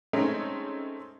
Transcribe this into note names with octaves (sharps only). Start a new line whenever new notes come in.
G#3 A3 C4 C#4 D#4